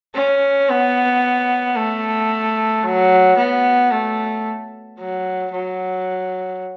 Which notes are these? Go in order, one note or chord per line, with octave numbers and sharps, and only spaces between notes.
C#4
B3
A3
F#3
B3
A3
F#3
F#3